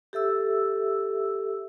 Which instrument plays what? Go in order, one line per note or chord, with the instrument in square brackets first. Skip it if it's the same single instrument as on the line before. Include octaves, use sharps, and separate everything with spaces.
[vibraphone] G4 A4 E5 E6